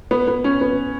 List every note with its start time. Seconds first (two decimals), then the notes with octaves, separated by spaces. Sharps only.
0.11 B3
0.28 B3
0.44 C#4
0.61 B3